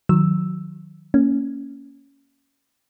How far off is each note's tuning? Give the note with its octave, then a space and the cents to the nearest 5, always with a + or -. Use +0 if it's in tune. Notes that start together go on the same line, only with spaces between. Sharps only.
D#3 +0 F#3 -25 E6 +0
A#3 -10 C#4 +0